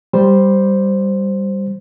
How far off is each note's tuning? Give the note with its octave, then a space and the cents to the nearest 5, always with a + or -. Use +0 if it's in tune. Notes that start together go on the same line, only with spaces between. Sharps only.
G3 +0 C5 +0